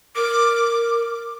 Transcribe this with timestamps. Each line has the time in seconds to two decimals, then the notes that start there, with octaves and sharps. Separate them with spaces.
0.15 A#4 D6